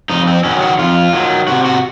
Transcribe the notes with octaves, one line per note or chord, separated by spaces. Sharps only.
F2 D#4
C4
D#3 F#3 C#4
F#4
F2 F4
D#3 F#3
C3 F#4
F#4